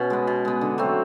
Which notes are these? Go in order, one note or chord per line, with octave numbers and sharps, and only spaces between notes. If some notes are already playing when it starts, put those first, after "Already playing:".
Already playing: B2 C#4 F#4 B4
G#3 B3
B2
G#3 B3
D3
F#3 A3 C4